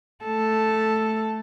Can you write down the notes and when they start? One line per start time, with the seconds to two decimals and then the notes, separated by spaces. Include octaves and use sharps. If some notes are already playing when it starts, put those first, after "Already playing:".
0.25 A3 A4